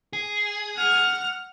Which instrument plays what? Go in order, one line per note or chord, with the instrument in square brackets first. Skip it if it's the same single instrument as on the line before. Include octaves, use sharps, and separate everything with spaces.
[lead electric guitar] G#4
[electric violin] F#5 F6